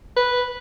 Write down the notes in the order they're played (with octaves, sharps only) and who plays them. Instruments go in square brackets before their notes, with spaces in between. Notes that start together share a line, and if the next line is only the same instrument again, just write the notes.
[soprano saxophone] B4